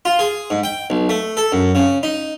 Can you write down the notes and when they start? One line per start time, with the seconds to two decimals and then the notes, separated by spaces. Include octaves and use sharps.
0.05 F4
0.19 G#4
0.50 G#2
0.63 G5
0.90 B1
1.09 A3
1.37 A4
1.52 F#2
1.75 C#3
2.03 D#4